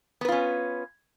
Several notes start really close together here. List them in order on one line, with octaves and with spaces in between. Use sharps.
B3 B4 F4 C#4